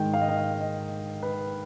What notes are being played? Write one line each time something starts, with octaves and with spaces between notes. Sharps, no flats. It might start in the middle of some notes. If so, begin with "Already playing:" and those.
Already playing: G#2 D#3 G#3 G5
F5
D#5
F5
D#5
D#5
B4